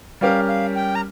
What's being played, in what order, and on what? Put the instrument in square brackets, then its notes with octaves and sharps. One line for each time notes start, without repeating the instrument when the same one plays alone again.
[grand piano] G3 C#4 G4 A#4 [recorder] F5
[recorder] F5
G5
A#5